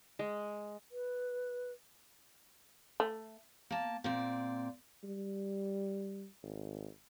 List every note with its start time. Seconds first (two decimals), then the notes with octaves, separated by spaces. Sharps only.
0.19 G#3
0.92 B4
3.00 A3
3.70 A#3 A5
4.04 A#2 C4 D5
5.04 G3
6.43 G#1